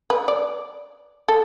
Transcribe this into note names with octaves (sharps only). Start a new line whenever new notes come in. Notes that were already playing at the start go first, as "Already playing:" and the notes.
B4
D5
A4